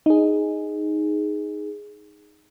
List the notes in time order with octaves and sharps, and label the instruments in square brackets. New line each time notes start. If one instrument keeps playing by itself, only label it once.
[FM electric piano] D#4 G#4